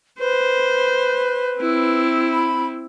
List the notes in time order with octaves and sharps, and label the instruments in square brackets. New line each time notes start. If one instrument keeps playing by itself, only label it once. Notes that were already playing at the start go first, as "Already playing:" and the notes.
[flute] B4 [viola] C5
[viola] C4 E4
[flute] B5